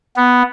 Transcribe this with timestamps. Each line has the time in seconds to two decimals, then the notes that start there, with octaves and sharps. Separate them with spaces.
0.16 B3